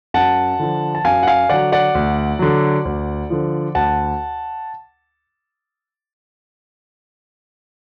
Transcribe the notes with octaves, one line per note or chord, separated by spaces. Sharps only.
F#2 F#5 A5
D3 F3
A5
F#2 F5 G#5
F#5
F5 G#5
D3 F#3 D5 F#5
D5 F#5
D2
D3 F#3
D2
D3 F3
D2 F#5 A5